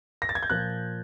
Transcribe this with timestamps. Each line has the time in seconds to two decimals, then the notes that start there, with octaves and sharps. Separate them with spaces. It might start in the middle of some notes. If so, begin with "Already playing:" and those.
0.22 A#6
0.29 A6
0.35 G#6
0.43 G6
0.50 A#2 F3 A#3 F#6